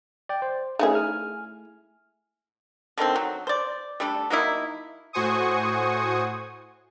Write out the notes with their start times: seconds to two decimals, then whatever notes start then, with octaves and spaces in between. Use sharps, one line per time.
0.29 D5 G5
0.42 C5
0.79 A3 C#4 D#4 E4 G#4
0.95 G#5 F6
2.98 D3 D#3 A3 C4
3.16 F#3
3.47 C5 D5
4.00 G3 A3 D4 A4
4.30 F#3 A#3 D#4 E4
5.13 A2 F#4 C5 G#5 C#6 D#6